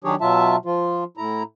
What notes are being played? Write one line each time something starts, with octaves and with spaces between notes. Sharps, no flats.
D#3 F#3 D4 G4 G#4 C#5
B2 F#3 F4 E5 A5
F3 F4
A2 E4 A#5